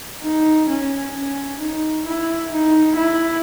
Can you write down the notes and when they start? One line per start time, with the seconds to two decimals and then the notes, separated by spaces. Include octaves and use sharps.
0.23 D#4
0.69 C#4
1.14 C#4
1.60 D#4
2.06 E4
2.52 D#4
2.97 E4